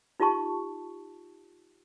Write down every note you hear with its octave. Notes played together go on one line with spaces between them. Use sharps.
D#4 F4 G4 A5 C#6